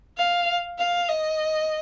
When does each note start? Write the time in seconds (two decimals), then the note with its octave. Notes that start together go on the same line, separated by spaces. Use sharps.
0.18 F5
0.79 F5
1.09 D#5